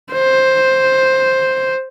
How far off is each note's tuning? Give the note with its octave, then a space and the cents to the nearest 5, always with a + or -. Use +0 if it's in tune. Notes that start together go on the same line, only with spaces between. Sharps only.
C5 +5